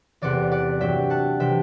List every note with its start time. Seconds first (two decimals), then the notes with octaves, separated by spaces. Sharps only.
0.22 E2 C3 E3 D5 F#5
0.51 D5 F#5
0.81 G2 F#3 E5 G5
1.10 F#5 A5
1.40 C3 E3 E5 G5